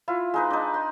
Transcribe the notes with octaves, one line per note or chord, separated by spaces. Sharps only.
E4 F4
G#3 D#4 B4
D4 D#4
C6